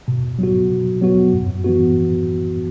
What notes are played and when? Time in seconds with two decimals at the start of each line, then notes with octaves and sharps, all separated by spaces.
0.08 B2
0.39 F#3 B3 F#4
0.70 B2
1.01 F#3 B3 F#4
1.33 F#2
1.64 E3 B3 F#4